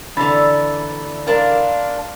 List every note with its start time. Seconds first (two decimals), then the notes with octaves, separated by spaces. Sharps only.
0.17 D3 E3 D4 A#5 B5 A6
1.27 D4 A#4 F5 A5 C6